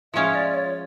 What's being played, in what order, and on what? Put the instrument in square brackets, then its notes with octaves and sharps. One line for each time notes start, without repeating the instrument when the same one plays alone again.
[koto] F3 G#3 C#4 F4 [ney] E5
[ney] D5
C#5